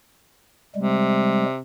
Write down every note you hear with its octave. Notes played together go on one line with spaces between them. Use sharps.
C3 G3 G#3